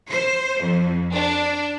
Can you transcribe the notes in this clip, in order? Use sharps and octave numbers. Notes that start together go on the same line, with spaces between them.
C5
F2
D4